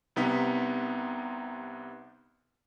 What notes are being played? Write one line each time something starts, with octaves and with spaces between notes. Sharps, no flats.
C2 C3 B3 D#4 B6